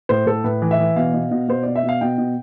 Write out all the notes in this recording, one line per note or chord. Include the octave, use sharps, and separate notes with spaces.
A2 C5
A2 A4
A2 B4
E3
E5
E3
B2 F5
B2
B2
B2 C5
B2 D5
E5
B2
F5
B2 G5
B2